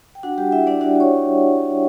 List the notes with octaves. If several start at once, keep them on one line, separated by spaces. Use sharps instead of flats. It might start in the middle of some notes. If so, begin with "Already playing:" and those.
G5
D4 F#4 F#5
G3 G4 G5
G3 E4 E5
G3 D4 D5
D4 F#4 D5
F#4 C#5 C#6